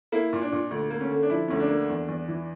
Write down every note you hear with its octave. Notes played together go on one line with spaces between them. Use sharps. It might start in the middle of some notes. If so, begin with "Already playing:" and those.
A#3 E4
A#2
D4
A#2
D2
A#3
C#4
D3
D4
F3 E4
D2 C#4
D4
A#3
E2
E2
E3